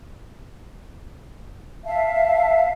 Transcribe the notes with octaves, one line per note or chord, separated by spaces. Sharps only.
E5 F5 A5